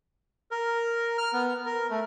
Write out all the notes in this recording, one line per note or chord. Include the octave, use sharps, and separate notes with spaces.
A#4
F6
B3
A#4
A3